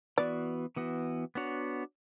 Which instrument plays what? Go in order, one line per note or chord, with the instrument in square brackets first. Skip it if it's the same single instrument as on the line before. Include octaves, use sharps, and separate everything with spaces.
[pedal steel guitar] E3 B3 F#4 [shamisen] D5
[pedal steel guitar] E3 B3 F#4
B3 D4 F#4 C#5